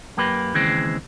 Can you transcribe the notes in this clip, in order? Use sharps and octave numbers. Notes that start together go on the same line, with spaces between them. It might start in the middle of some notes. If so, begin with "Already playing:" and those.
F#2 A#3 G4 B4
D#2 C#3 E3 G#3 C4